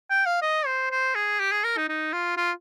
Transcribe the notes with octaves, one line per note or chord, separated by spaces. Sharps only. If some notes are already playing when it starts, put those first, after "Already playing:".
G5
F5
D#5
C5
C5
G#4
G4
G#4
A#4
D#4
D#4
F4
F4